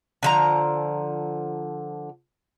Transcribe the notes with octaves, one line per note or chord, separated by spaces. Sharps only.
D3 F3 A#5